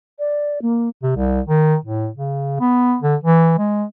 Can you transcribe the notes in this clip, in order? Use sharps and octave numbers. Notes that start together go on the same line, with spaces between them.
D5
A#3
C3
C2
D#3
A2
C#3
B3
D3
E3
G#3